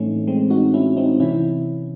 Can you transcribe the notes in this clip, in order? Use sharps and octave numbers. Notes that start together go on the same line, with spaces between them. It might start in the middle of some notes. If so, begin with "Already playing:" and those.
Already playing: A2 E3 A3 C4 C#4 D#4
G#3 C4
D#4 F#4
C#4 E4
C4 D#4
C3 E3 C#4 E4